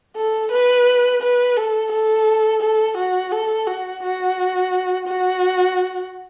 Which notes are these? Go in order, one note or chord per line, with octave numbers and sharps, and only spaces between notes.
A4
B4
B4
A4
A4
A4
F#4
A4
F#4
F#4
F#4